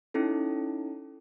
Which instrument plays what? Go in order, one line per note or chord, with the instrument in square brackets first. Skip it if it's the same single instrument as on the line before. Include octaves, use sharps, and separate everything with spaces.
[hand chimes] C#4 D#4 E4 A4